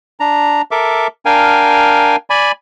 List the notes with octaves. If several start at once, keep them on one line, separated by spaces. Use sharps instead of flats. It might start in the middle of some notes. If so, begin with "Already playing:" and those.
D4 A#5
A4 A#4 E5 D6
D4 A#4 F5 G5 G#5
D5 G#5 B5